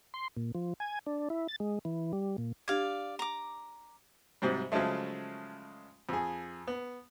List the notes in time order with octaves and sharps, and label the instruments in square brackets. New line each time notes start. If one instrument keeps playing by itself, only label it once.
[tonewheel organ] C6
A#2
F3
G#5
D4
E4
A6
G#3
E3
G3
A#2
[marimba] D4 G4 G#6 [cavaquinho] D5 F5
[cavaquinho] A#5 D6
[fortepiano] G#2 C3 F#3 G3
C#3 F3 F#3 G#3 A3
F2 G#4
B3